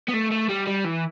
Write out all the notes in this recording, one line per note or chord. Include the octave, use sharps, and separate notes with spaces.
B3
A3
A3
G3
G3
E3